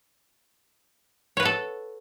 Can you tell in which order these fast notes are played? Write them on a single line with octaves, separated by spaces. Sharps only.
C#5 B4 F#5 A4